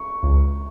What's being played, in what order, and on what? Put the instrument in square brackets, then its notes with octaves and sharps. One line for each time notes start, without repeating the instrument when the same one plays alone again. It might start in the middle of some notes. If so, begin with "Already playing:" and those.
Already playing: [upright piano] C#6
[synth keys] C#2